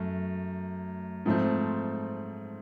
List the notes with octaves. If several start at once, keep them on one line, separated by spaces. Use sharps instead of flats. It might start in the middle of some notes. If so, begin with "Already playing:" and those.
Already playing: F#2 A3
G#2 F3 A3 C4